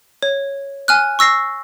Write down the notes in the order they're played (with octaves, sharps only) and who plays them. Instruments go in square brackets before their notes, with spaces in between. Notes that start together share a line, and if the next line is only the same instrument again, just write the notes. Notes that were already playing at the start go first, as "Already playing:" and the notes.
[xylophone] C#5
G#5 F6 F#6
C#6 E6 A#6 C7